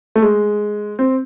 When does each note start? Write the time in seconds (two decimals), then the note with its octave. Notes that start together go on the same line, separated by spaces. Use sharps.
0.16 A3
0.22 G#3
0.99 C4